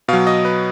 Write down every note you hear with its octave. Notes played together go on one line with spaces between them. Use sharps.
B2 F#3 F5
D#5
B4